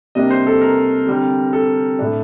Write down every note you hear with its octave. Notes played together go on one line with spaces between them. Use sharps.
C3 G3 A#3 D4 D#5
C5
A4
A#4
D3 G3 C4
A4
A2 A3 D4